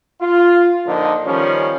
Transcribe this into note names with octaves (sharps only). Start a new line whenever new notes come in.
F4
A#2 D3 F3 D#4
D#3 F3 G3 C#4